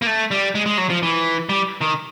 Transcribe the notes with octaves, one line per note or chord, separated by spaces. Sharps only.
A#3
A3
G3
G#3
G#3
F#3
F3
E3
G3
D#3